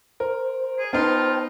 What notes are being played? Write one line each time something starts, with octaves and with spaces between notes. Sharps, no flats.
A#4 C5
G#4
B3 D#4 F4 C5 G5 A5